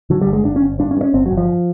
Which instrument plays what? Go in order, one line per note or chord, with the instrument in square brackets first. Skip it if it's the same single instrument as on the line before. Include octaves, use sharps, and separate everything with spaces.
[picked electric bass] D3 F#3
G3
G1
G#3
G1 D4
C#4
G1
G2 D4
C#4
G2
C#4
G1 C4
F#3
G1
F3